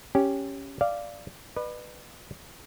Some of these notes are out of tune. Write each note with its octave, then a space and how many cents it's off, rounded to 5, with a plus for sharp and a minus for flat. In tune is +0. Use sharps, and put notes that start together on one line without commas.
C#4 +0 G4 +0
D5 +0 F5 -15
B4 +0 D5 +45